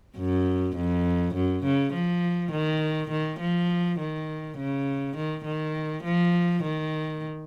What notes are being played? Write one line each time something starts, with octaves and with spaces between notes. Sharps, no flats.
F#2
F2
F#2
C#3
F3
D#3
D#3
F3
D#3
C#3
D#3
D#3
F3
D#3